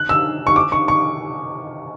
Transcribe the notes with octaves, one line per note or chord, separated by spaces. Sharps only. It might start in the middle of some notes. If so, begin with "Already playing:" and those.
Already playing: F#6
E6
C#6
D6
C#6
C#6